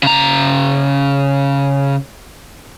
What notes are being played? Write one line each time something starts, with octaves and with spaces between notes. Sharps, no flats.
C#3 A#5